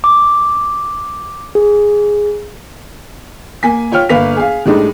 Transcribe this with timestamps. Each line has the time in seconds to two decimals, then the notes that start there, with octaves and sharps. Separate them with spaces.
0.04 D6
1.55 G#4
3.63 A#3 G#5 B6
3.92 F4 C#5 G5 F6
4.09 G1 A#3 B4 F5 B6 F7
4.36 G#4 F5
4.66 A2 G3 G#3 D4 D#4